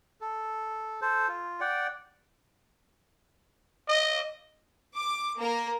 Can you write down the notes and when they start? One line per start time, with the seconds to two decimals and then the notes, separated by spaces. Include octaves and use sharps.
0.21 A4
1.02 A4 C5
1.28 F4
1.60 D5 F#5 G5
3.88 D#5
4.96 D6
5.40 A#3 A#4